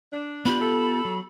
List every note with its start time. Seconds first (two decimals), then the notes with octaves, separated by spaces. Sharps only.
0.13 D4
0.45 B3 F4 G4 B5
0.61 A4
1.05 F#3